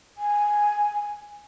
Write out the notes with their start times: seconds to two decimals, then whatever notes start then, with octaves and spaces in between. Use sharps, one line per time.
0.18 G#5